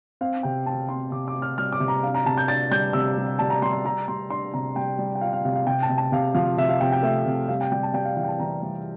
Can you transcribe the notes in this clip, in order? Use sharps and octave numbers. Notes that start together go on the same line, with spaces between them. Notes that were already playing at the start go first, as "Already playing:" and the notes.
C4 F5
C3 G5
C4 A5
C4 C6
C3 D6
D6
C4
F6
G3 F6
D6
C3
A#5
D4 F5
A#5
C3 A5
G6
D4 A6
G3 G6
C3 E6
G3
G3 A5
A#5
G3 C6
C6
G3 A#5
G3 C6
D4 C6
C3 A#5
G3 G5
G3
G5
F4 F5
F5
C3 F5
F5
C3 G5
A5
C3
A5
C3 F5
F3 F5
C3 E5
F5
C3 G5
G5
A3 E5
C3
G3 F5
G5
G3 G5
A5
G3 G5
F5
E3 F5
G5
A5
E3 A#5
G3